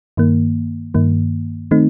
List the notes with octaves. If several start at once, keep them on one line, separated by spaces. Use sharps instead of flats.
G2 D#3 A#3
G2 D#3 A#3
D#3 A3 C4 D#4